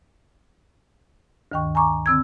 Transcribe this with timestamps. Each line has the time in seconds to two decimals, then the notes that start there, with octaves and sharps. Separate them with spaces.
1.52 D2 G2 D#3 G5 C#6
1.75 G#5 A#5 C#6 D6
2.06 D3 C4 E6 G#6